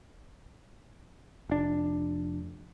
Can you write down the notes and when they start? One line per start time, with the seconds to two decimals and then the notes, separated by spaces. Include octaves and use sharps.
1.49 F1 D4